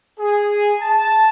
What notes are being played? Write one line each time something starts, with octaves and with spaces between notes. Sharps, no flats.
G#4
A5